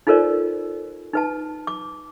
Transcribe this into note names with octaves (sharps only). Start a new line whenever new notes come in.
D#4 F4 A4 A#4 C5 D5
D#4 B4 A5
D6